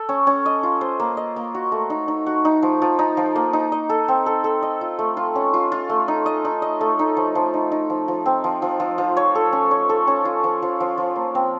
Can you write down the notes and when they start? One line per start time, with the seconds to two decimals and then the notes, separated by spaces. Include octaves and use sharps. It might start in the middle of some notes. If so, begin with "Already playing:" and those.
Already playing: A4
0.09 C#4
0.27 C#4
0.46 D#5
0.63 F4
0.81 C5
1.00 A#3
1.17 D#5
1.36 A#3
1.55 F#4
1.72 A3
1.90 D#4
2.08 D#4
2.27 F#4
2.45 D#4
2.63 F3
2.82 F3
2.99 D#4
3.17 F3
3.36 A#3
3.53 D#4
3.72 D#5
3.90 A4
4.08 C4
4.26 A4
4.44 A4
4.62 D#5
4.81 F4
4.99 A3
5.17 F4
5.35 C#4
5.54 F4
5.72 F4
5.89 A3
6.08 D#4
6.26 D#5
6.45 D#4
6.62 D#5
6.81 A3
6.99 D#4
7.17 F3
7.35 F3
7.54 D#4
7.72 D#4
7.90 F3
8.08 F3
8.26 C4
8.44 F3
8.62 F3
8.80 F3
8.98 F3
9.17 C#5
9.35 A4
9.53 C#4
9.71 C#5
9.89 A4
10.07 C#4
10.25 F4
10.44 F3
10.62 F3
10.80 F3
10.98 F3
11.16 A#3
11.35 C4